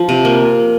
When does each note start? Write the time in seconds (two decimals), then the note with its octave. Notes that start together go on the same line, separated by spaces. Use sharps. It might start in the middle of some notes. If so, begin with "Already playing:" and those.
Already playing: F3
0.09 C3
0.25 A#3